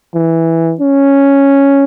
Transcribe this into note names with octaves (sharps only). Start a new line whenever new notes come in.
E3
C#4